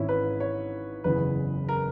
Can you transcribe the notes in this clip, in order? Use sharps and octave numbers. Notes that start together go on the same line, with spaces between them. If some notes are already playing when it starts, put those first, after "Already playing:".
Already playing: G#1 G#2 E3 C#4 E4
B4
C#5
F#1 E2 C#3 E3 B4
A#4